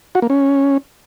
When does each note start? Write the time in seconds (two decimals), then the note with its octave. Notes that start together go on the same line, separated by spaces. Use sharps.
0.15 F#4
0.22 A#3
0.30 C#4